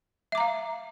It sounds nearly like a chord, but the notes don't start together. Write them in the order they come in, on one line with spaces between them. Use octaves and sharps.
E5 D6 A#5 F5